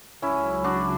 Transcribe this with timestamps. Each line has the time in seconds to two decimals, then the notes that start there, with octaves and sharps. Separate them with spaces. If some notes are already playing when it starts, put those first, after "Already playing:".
0.22 C#2 C#3 F#3 C#4 E4
0.64 D4 F#4